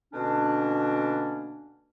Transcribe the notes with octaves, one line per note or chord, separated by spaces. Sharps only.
B2 D3 A#3 C#4 D4